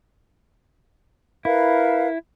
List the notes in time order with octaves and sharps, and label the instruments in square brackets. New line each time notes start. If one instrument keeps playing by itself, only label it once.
[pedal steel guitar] E4 [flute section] A#4 B4 F5